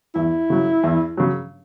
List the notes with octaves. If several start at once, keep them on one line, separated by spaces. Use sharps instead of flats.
E2 E4
C#3 F#3
E2
C#3 F#3